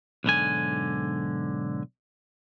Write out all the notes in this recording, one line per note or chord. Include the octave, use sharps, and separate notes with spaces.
B1 G#2 D3 G#5